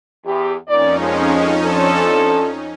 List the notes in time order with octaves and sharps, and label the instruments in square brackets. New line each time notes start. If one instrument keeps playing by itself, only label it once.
[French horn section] E2 G4
[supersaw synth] F2 C#4 D#4 [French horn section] A#2 D5
[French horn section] A#2 F3 G#3
F3 D4 A4